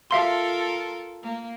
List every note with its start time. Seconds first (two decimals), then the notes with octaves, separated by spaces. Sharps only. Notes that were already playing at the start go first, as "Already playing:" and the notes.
0.11 F4 A4 A#4 E5 F5 C6
1.23 A#3